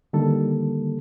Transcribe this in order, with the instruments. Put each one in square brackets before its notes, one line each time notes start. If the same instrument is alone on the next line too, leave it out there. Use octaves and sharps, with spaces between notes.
[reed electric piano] D3 D#3 G3 A#3 A4